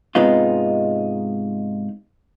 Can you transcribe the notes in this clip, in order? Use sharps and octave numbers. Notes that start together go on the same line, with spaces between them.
G#2 C3 G#3 B3 D#4 F4